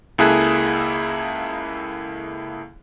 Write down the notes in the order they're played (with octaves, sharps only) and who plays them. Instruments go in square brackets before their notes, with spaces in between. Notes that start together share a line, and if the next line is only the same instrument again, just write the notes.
[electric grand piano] C#2 A#3 E4 G#4 A4 F#6